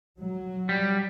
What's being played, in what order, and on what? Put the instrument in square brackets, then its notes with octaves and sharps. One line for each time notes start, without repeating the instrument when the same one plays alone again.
[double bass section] F#3
[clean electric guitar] G3